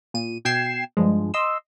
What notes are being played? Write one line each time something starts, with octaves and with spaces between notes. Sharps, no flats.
A#2 D#7
B2 G5 G#6 C7 E7
G2 F3 G#3
D#5 C6 E6